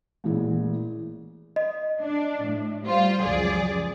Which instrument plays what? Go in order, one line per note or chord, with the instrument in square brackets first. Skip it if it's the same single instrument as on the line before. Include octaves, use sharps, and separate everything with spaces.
[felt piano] A1 A#2 E3 G#3
[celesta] D#5
[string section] D4
A2
G3 F4 C5
C#2 F#2 F3 G#4 D5